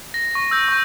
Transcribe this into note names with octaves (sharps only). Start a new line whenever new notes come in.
A#6
C#6
E6 G6
C#6 G6